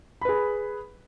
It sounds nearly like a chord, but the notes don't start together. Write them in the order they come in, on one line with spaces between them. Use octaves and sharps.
B5 B4 G#4